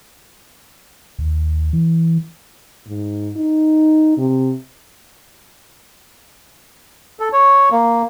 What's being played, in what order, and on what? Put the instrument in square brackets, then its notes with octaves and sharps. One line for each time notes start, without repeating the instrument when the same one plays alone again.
[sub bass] D#2
E3
[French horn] G#2
D#4
C3
[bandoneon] A4
C#5
A#3